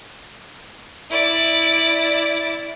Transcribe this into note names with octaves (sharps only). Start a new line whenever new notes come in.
E4 D5